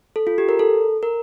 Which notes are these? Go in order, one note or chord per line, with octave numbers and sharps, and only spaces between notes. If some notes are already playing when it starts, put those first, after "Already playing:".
A4
F4
G4
A#4
A4
A#4